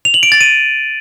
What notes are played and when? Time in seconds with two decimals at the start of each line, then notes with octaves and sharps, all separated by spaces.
0.05 F7
0.14 F#7
0.23 D7
0.32 A6
0.41 D#7